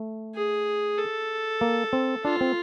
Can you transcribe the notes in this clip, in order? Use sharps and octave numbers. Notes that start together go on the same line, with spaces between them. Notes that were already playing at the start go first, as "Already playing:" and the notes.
Already playing: A3
G#4
A4
A#3
C4
D4 F4
C4